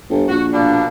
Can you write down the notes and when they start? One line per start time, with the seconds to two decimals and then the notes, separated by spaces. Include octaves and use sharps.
0.10 G1
0.29 A#1 F#4
0.53 B2 A#3 D4